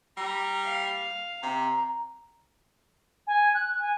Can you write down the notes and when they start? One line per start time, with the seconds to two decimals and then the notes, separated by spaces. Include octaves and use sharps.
0.17 G3 A#5
0.64 F5
1.43 C3 A#5
3.27 G#5
3.54 F#6
3.79 G#5